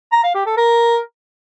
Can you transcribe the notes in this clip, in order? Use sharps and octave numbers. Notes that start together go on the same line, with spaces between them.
A#5
F5
G4
A4
A#4